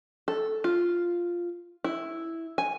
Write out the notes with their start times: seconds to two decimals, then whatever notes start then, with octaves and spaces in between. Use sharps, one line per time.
0.28 A4
0.64 F4
1.84 E4
2.58 G#5